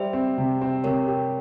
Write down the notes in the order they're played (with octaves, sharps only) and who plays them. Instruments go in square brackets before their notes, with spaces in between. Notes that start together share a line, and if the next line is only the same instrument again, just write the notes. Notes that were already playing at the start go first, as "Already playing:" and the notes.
Already playing: [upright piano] G3 [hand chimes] C5 E5
[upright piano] C4
C3
C4
[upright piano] C3 [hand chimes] A#4 C#5
[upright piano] G4